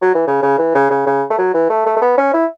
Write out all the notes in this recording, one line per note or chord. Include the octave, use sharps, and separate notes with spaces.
F#3
E3
C#3
C#3
E3
C#3
C#3
C#3
A3
F#3
E3
A3
A3
A3
B3
C#4
E4